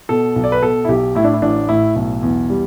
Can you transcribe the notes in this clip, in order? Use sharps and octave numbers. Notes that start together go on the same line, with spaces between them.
B2 A4
B1
D5
B4
B2 A4
E4
B1 G4
A2 E4
D4
E4
A1 D4
A2 E4
B1
E2
G3